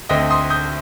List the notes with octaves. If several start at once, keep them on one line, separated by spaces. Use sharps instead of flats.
D2 D3 A3 C4 D#5 G5
C6 D#6
D#6 G6